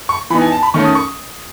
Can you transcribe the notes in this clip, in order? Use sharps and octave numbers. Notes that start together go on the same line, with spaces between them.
C#6
E3 B3 D#4 B5
G#5
A5
B5
D#3 A3 C#4 C#6
D#6
C#6